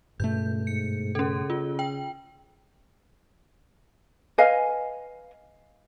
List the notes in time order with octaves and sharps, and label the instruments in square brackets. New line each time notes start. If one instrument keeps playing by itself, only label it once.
[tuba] C#2 [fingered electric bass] G2 B2 A3 [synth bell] G6
[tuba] G#2 [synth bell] C#7
[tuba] C#3 [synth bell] C#4 A4
[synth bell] F4
G5
[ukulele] B4 D#5 F5 G#5